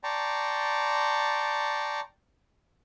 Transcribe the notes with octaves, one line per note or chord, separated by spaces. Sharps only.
D5 G5 A5 A#5 C6 C#6